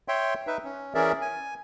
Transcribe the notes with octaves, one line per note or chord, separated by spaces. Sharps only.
C#5 E5 G5 C6
D#4 B4 E5
C#4
E3 C#4 G#4 A#4 D5 E5
G#5